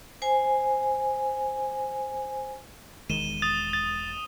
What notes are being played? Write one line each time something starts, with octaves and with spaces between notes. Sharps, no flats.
C5 G#5
E1 D#3 G#3 D#7 E7 G7
D#6 A6
A6